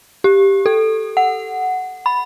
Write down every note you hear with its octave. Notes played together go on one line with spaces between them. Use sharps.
G4
A4
F#5
B5